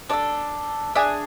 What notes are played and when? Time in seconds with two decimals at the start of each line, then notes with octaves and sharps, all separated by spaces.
0.09 D4 D5
0.13 A4
0.96 D4 G#4 E5